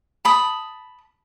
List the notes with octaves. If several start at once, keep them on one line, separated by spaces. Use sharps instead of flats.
A5 B5 D#6